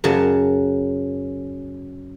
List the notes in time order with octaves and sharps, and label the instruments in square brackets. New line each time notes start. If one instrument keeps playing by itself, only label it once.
[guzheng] F#2 C#3 F#3 A5